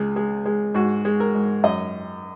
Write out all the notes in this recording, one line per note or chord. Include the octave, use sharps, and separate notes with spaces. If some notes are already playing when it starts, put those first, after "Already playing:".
Already playing: C#2 G#3
G#3
G#3
G#2 F#4
G#3
A#4
G#2
F#2 D#5